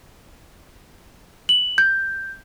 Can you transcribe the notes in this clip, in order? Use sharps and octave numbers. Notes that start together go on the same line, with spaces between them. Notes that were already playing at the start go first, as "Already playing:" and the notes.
F#7
G6